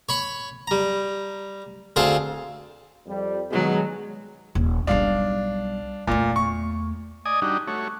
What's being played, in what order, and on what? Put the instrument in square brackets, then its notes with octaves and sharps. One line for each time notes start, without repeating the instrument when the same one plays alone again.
[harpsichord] C#5 B5 C#6
G3 A#5
D2 C4 G#4 C5 F5 A5
[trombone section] F2 G3
[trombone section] B1 B2 G#4 [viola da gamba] D#3 F#3 G#3
[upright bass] D#1
[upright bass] B1 G3 [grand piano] D4 F5
[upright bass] E2 A3 [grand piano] A#2
[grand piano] C#6
[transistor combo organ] D5 D#5 G#5 D#6
G3 D4 D#4 F#4
A3 F#4 C#5